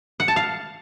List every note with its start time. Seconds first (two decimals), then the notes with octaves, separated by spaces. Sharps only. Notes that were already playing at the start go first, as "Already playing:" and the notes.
0.20 F#5
0.28 A5
0.36 F5